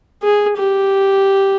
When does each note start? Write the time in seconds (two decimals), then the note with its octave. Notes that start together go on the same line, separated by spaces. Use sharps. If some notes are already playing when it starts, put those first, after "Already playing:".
0.23 G#4
0.57 G4